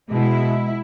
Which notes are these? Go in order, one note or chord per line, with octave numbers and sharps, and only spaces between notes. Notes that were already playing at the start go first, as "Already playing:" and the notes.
B2 G#3 E4